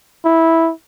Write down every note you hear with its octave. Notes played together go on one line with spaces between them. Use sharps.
E4